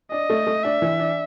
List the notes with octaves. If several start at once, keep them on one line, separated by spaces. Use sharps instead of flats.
D4 D#5
A3
A3
D4 E5
E3
D4